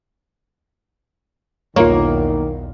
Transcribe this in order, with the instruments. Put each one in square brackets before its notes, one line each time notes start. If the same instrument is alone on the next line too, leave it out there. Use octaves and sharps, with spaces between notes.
[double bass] B1 E2 [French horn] D#3 [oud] A#3 [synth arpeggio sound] F4 A#4 C#5